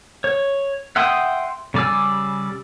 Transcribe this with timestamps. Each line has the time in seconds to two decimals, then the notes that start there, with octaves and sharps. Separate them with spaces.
0.24 C#5
0.96 E5 F#5 G5 C6 D#6
1.74 C#3 G3 D5 G#5 E6